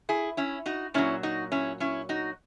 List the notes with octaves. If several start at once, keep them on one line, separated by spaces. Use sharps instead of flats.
E4 G#4
C#4 E4
D#4 F#4
A#2 F#3 C#4 E4
D#4 F#4
C#4 E4
C#4 E4
D#4 F#4